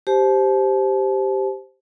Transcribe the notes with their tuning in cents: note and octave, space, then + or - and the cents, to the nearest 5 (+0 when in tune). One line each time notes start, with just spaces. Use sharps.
G4 +0 C5 +0 A5 -35